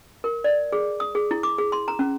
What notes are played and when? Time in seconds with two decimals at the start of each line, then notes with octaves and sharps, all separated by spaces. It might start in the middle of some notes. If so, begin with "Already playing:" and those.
0.24 A#4
0.44 D5
0.72 G#4
1.00 D#6
1.15 G#4
1.31 E4
1.43 D6
1.58 G#4
1.72 C6
1.88 A#5
1.99 C#4